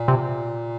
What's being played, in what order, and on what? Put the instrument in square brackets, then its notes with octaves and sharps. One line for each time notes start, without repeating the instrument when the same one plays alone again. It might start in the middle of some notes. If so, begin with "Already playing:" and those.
Already playing: [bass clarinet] A#2
[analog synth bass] C3